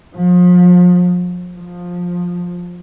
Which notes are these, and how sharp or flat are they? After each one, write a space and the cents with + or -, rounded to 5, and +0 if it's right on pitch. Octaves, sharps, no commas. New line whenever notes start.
F3 +35
F3 +15